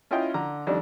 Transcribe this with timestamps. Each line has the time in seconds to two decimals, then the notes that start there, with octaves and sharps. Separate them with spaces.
0.11 C#4 E4 F4 D#5 G5
0.34 D3 A#5
0.67 F2 D#3 G3 D4